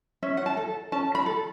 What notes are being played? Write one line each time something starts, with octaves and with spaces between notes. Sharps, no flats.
C#4 E5
F#5
A5
A4
C#4 A5
B5
A4